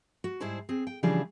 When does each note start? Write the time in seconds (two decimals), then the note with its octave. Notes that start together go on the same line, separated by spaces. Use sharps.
0.24 F#4
0.40 G#2 G3 E4 G#4 C5 A5
0.69 C4 G#4
0.87 G5
1.03 C#3 E3 F3 G3 D4 G#4